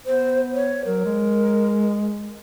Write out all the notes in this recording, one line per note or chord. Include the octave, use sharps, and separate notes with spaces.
B3 C5
C#5
F#3 A#4
G#3